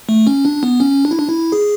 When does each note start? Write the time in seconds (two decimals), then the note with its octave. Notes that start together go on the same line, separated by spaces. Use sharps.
0.09 A3
0.27 C#4
0.45 D4
0.63 B3
0.80 C#4
1.05 D4
1.11 E4
1.19 D4
1.29 E4
1.52 G#4